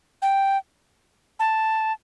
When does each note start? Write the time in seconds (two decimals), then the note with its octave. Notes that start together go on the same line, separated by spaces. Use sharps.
0.22 G5
1.40 A5